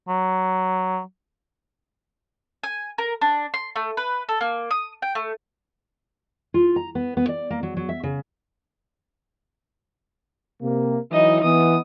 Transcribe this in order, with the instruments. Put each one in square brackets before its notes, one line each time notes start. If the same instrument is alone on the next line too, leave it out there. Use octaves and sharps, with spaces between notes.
[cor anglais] F#3
[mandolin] G#5
A#4
D4
C6
A3
B4
A4
A#3
D#6
G5
A3
[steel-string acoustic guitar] F4
A#5
B3
B3
D5
A#3
F#3
F#3
E5
C#3
[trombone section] C3 A#3
[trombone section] E3 F#3 E4 [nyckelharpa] D#4 D#5
[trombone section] E3 B3 [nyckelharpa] D#6